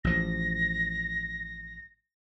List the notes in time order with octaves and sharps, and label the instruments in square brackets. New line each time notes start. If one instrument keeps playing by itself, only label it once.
[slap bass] A1 F3 [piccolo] A#6